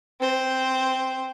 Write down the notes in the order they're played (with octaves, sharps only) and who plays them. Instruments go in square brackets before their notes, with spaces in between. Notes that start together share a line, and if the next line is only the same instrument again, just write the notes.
[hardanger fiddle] C4 C5